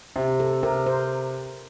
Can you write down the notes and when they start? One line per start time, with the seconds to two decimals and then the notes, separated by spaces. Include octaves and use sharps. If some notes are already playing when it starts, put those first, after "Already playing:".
0.16 C3
0.40 A4
0.63 C3 A#4
0.86 C5